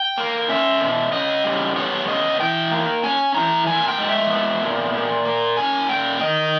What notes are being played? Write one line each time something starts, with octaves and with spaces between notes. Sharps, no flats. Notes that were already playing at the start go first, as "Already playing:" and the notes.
Already playing: G5
A#3
C#4 E5
B2
C#3 D#5
G3
B3 C#5
C#3 D#5
E3 G5
A#3
C#4 G#5
E3 A#5
A#2 G#5
G5
G#3
E5
B3
A#2
A#2
A#3
C#4 G#5
A#2 G5
D#3 D#5